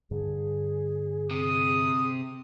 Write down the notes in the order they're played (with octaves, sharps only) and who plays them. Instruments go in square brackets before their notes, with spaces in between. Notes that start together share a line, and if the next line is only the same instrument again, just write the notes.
[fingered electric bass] G2 D3 [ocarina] G#4
[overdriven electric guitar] C3 [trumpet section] D#6